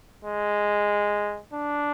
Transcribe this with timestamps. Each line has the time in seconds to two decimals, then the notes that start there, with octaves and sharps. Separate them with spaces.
0.25 G#3
1.53 D4